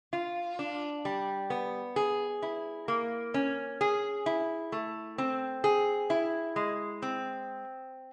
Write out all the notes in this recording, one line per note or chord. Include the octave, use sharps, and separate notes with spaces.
F4
D4
G3
B3
G#4
E4
A#3
C#4
G#4
E4
A3
C4
G#4
E4
G#3
C4